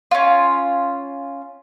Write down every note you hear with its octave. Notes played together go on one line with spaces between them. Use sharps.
C#4 F4